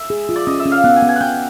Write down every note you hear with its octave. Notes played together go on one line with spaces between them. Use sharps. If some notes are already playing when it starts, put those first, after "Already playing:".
Already playing: E5
G#4
F4
D5
C#4 D#5
E5
C#4
F5
B3 F#5
G#5
B3
G#5
B3 F#5 G5